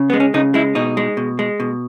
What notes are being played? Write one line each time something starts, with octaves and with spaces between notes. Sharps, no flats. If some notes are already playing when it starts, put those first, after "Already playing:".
Already playing: C#3
G#3 B3
C#4
C#3 D#4
G#3 E4
B2 D#4
G#3
B2
G#3
B2